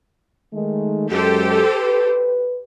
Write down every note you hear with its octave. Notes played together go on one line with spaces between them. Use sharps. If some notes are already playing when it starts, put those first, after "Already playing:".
D#3 G#3 A3
F#2 G#3 G4 A4 C5
B4